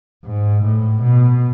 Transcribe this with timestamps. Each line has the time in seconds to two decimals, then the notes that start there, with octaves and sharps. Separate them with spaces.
0.25 G#2
0.64 A2
1.02 B2